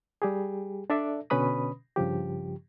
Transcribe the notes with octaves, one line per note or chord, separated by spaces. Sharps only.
G3 G4 G#4
D4 A4 D5 E5
B2 D3 C#4 B4 B5 D#6
G2 C#3 F3 G4